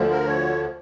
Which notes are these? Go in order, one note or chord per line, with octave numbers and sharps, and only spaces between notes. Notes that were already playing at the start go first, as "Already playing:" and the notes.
Already playing: D2 D3 F3
A#4
C#5